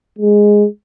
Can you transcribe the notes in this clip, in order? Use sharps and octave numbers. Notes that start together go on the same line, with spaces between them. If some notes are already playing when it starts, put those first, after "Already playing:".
G#3